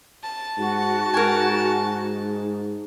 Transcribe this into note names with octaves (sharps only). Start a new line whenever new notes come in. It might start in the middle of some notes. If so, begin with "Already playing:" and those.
A5
G#2 F#4
G#2 A#4 G#5